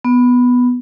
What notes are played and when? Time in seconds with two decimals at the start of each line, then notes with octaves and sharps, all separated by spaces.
0.05 B3